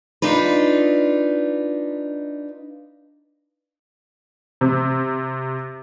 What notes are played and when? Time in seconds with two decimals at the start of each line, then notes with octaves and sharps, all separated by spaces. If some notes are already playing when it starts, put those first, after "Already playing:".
0.22 D4 D#4 F4 B4
4.61 C3